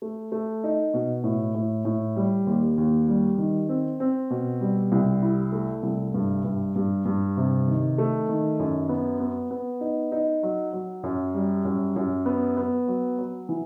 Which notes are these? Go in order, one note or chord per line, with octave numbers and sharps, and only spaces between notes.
A3
A3
D#4
B2
A2
A2
A2
G3
D#2
D#2
G3
D#3
C4
C4
B2
G3
C2
E4
A3
C2
G2
G2
G2
G2
C3
D#3
A3
D#3
F#2
B3
B3
B3
D#4
D#4
F#3
F#3
F#2
G3
F#2
F#2
B3
B3
F#3
F#3
E3